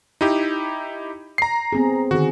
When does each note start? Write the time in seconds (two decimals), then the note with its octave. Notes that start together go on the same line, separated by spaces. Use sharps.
0.21 D#4 E4 G4
1.38 A#5 C7
1.73 B3 C4 G#4
2.11 D3 D#3 F#4 G#4